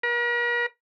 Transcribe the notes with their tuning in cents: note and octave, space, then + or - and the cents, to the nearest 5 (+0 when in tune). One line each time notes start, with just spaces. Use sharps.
A#4 +45